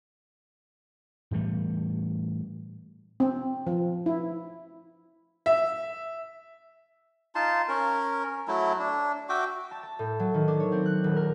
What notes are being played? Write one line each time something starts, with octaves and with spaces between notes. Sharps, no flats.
A2 E3 G3 A3
C4
F3
E4
E5
D#4 F4 A5 C6
C#4 A#4
F#3 A3 E4
D4
F#4 E5 G5 D6
A5
A5
A2
F#3
D#3
D4
C#5
C4
F#6
D#1
A#4